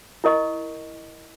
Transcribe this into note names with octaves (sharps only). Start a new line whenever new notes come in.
E4 A#4 D#5 C#6